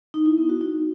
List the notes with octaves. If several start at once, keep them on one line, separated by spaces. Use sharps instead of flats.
D#4
E4
B3
F#4
D#4